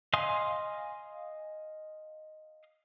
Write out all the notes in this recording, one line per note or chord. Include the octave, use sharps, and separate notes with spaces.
D#5 F5 G#5 C6 D#6